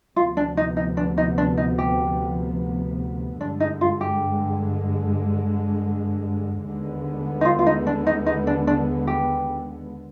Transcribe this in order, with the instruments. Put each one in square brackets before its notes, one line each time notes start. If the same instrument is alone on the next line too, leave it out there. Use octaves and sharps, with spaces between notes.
[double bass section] D2 C3 F3 B3 [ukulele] F4
[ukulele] D4
D#4
D#4
D4
D#4
D4
D#4
G4
[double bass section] G2 D3 G#3 [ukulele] D4
[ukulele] D#4
F4
G4
[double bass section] D#2 D3 G#3 B3
[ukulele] D#4
F4
F4
D#4
D4
D#4
D#4
D4
D4
G4